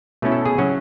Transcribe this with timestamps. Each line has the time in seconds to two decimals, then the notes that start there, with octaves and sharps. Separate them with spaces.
0.22 B2 A3 C#4 E4
0.32 A4
0.45 G#4
0.58 C#3 F#3 C#4 F#4